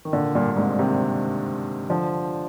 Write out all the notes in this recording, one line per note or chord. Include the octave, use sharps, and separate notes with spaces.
D#3
A#2 D3
G2 A#2
A#2
G#2 C3
C3 D#3
D3 F3